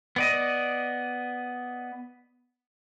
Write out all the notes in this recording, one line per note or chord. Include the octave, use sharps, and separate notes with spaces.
B3 D5 D#5